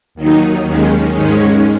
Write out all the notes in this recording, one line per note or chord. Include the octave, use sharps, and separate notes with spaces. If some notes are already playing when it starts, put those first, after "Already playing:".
D#2 D#3 F#3 D#4
D#2 D#3 G#3 C#4
G#2 D#3 G#3 C#4